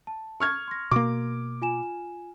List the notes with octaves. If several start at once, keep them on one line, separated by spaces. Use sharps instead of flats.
A5
C#6 F6 G#6
C6 A#6
B2 A#3 D6
F4 G#5 E7